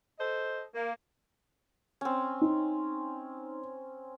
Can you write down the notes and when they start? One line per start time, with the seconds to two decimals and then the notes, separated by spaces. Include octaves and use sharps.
0.18 A4 C5 D#5
0.74 A#3
2.01 C4 C#4
2.41 D#4